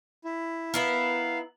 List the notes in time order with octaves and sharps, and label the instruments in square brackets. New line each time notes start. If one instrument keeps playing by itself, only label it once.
[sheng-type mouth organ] E4
[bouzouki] B3 E4 A#4 [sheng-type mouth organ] F5